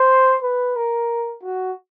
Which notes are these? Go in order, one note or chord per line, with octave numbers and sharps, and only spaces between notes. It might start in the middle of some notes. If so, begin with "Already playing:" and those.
Already playing: C5
B4
A#4
F#4